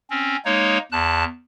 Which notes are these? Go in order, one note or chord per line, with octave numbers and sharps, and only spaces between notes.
C4 C#4
G#3 A#3 D#4 C#5
E2 A5 F#6